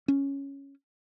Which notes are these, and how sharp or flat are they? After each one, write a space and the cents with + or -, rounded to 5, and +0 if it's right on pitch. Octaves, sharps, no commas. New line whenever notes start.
C#4 +0